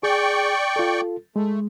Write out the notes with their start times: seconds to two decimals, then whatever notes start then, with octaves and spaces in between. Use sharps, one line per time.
0.03 G#4 D5 G5 C#6
0.76 F4 A4
1.36 G#3 A3